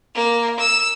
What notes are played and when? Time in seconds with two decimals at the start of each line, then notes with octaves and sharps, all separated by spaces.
0.15 A#3
0.60 E6